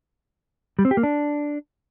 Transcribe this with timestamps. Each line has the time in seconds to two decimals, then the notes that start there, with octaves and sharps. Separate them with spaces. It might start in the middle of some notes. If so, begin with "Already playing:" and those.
0.79 G3
0.85 C4
0.91 G4
0.97 A#3
1.03 D4